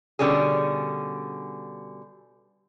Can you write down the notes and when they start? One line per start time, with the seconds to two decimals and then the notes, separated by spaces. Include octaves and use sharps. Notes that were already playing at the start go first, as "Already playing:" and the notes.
0.19 B2 D3 G3 C#4 G#4